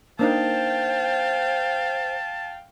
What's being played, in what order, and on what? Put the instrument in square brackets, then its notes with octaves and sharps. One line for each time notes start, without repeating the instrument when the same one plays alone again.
[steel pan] A#3 D4 D#4 [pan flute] C5 [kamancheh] F5 G5 [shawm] A5